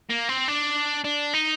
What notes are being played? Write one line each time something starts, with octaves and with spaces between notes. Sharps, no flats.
A#3
C4
D4
D4
D#4